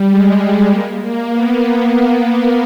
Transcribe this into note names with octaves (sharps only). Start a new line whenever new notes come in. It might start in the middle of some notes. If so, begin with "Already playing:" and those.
Already playing: G3
G#3
A#3
A#3
B3